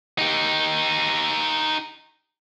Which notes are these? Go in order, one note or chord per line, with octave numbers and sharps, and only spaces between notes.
D#4 G4